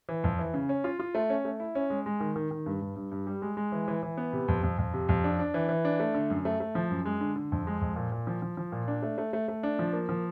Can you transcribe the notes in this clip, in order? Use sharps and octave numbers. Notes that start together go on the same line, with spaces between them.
E3
F2
E3
C#3
C#4
F4
F4
A3
C#4
A3
E4
C#4
G#3
G#3
D#3
D#3
D#3
G2
G2
G2
G2
G3
G#3
G#3
E3
E3
E3
B3
C3
F2
F2
F2
C3
F2
D4
D4
E3
E3
D4
A3
D3
F#2
A3
A3
F3
F#2
G#3
D3
D3
F2
G#3
F2
A#2
A#2
F3
F3
F3
A#2
D4
A3
A3
A3
A3
D4
F3
A#3
F3